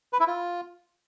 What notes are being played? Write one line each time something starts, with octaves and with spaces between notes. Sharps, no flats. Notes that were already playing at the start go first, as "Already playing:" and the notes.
B4
E4
F4